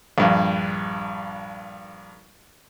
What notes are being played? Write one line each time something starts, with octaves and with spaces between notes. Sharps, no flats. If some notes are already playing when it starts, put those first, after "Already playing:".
A#1 G2